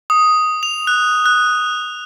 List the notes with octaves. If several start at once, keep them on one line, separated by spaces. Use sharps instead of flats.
D#6
F7
F#6
F#6